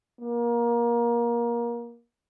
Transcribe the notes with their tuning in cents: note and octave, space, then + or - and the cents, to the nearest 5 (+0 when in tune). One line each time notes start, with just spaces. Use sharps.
A#3 +25